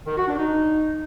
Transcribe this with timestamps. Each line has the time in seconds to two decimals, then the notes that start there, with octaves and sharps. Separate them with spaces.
0.07 D#3
0.17 F#4
0.28 D4
0.38 D#4